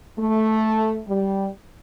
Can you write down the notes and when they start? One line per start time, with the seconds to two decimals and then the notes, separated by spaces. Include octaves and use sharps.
0.18 A3
1.07 G3